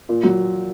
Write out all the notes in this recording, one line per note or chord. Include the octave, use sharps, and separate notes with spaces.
A#2
F#3